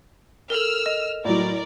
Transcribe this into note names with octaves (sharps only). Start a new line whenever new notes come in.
A4 A#4 E6 F6
D#5
A2 F#3 A#4 D5